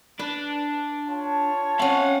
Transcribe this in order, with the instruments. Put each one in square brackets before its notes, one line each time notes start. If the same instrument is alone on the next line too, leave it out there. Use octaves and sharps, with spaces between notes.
[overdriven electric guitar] D4 [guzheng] B4
[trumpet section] F4 C#5 A5
[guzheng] C4 C#4 [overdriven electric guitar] F5 F#5